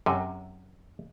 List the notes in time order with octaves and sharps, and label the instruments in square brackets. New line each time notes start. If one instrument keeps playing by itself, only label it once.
[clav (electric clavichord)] F#2 C3